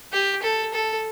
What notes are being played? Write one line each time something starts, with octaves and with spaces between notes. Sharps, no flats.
G4
A4
A4